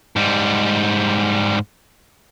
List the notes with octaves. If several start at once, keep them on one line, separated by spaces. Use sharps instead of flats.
G#2 G3